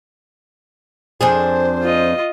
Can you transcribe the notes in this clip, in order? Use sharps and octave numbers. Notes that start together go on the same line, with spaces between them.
F2 D4 G#4 C5
F4 D#5